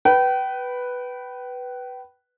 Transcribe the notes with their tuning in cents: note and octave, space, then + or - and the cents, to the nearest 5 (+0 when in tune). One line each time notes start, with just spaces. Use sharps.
B4 +0 G5 -30